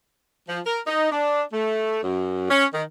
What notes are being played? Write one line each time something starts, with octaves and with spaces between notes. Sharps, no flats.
F3
A#4
D#4
D4
A3
F#2
C#4
D#3